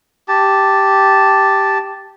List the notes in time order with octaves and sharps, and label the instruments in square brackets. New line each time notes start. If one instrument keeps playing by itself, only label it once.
[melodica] G4 A5